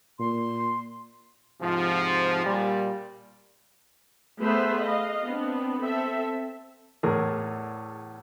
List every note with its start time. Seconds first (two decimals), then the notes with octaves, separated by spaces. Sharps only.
0.19 A#2 C6
1.61 G#2 C3 F3
2.45 A#2 G3
4.40 A3 B3 G#4 B4 C5 E5
4.83 D#5 F5
5.24 B3 C4 D4
5.79 C4 A4 E5
7.03 E2 A2 G#4 A#4